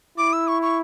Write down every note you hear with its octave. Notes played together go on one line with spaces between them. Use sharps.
E4 D6
E6
C#6
C#6